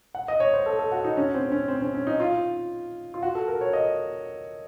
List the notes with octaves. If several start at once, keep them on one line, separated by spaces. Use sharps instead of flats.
F#5
D#5
C#5
C5
A4
A4
F#4
D#4
C#4
C4
C#4
C4
C#4
C#4
D#4
F4
F4
F#4
A4
A#4
C#5
D#5